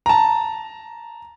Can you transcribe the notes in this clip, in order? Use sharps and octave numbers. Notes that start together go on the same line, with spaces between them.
A5 A#5